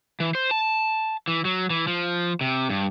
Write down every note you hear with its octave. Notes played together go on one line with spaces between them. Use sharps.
E3
C5
A5
E3
F#3
E3
F3
C3
G2